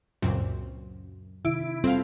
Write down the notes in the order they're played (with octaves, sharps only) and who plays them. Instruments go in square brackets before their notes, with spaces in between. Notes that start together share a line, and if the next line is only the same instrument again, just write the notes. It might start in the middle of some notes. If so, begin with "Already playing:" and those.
[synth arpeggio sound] C#2 A#2 C4 [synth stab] F#2
[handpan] C3 D#3 [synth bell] E4 D7
[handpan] G3 F4 A4 [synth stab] C4 F5